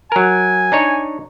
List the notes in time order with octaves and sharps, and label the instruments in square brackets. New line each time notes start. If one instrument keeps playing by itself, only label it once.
[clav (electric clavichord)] F#3 A#4 [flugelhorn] G#5
[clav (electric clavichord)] D4 D#4 C#5